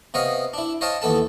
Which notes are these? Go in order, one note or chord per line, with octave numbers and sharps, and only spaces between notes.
C3 B3 C#5 D#5 F5
D4 E4
C5 C#5 D#5 F5 G5 A5
D#2 E3 B3 A4 A5